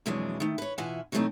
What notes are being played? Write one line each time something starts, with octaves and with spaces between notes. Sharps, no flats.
F2 B2 E3 F#3 G#3 D4
D#3 A3
B4 C#5
B2 E3 F4 E5 F#5 G#5
B2 E3 F#3 A3 C4 D#4